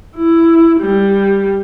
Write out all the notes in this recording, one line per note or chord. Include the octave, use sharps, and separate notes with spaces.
E4
G3